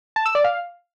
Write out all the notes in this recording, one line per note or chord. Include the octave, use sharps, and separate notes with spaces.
A5
E6
D5
F5